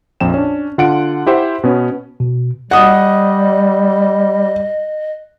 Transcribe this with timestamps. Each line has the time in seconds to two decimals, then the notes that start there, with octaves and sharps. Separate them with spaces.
0.20 A#1 F2 G5 E7
0.34 C#4 D4
0.78 D3 F4 F#5 F#6 D7
1.27 E4 G4 C5 E5 F#5
1.64 B2 B3 C#4
2.20 B2
2.71 G3 D#5 F#5 D#6